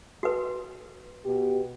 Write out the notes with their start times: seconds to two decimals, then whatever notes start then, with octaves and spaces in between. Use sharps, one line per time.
0.23 F#4 B4
1.25 B2 G4